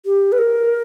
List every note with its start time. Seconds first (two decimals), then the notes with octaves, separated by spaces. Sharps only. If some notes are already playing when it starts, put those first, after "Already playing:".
0.06 G4
0.32 B4
0.38 A#4